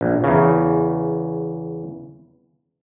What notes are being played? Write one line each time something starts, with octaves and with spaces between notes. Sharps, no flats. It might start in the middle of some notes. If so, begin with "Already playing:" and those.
A#1
E2 C#3